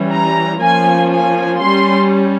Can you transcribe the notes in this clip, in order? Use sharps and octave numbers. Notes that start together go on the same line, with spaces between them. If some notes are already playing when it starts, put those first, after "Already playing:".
Already playing: E3 G3 C#4
A#5
F3 A#3 C#4 G#5
G#5
G3 C#4 C6